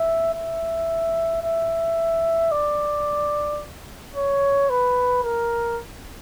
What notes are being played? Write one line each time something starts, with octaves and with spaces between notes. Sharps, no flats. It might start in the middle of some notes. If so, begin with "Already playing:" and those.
Already playing: E5
E5
E5
D5
C#5
B4
A#4